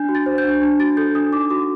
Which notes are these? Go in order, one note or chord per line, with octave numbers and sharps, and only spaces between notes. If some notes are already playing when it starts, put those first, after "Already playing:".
Already playing: D4 G6
F#4
A6
C5
G6
D4
D4
F#4 A6
A4 G6
D4 D#6
D#4 D6
F#4 D6